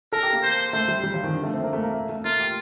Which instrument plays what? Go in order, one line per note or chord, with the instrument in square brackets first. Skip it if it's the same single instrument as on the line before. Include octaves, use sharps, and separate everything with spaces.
[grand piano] A4 [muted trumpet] A#4
[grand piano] G4
A#3
[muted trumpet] C5
[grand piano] A3 [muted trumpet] C5
[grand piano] G3
G3
F3
D#3
D3
A3
C4
A#3
A3
A#3
A3
A3
[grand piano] A#3 [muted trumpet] F4
[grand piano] G4